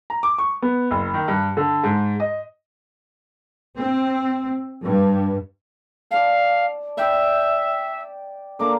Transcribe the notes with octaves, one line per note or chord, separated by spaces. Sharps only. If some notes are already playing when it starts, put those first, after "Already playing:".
A#5
D6
C#6
B3
F#1
D#3
G2
D3
G#2
D#5
C4
G2
D5 F5 A5
D5 E5 G5
D3 A#3 A#5 D6